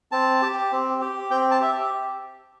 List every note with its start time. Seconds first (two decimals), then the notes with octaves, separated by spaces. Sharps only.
0.12 C4 A5
0.42 G4
0.72 C4
1.01 G4
1.31 C4 G5
1.51 A5
1.60 G4 E5